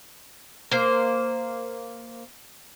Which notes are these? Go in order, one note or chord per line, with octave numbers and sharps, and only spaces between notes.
A#3 C5